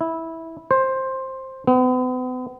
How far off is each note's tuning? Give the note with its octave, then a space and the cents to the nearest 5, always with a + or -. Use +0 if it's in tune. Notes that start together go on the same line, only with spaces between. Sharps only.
E4 -15
C5 +10
B3 +40